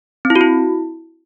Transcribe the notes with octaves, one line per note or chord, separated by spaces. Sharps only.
C4
E4
F#4
E4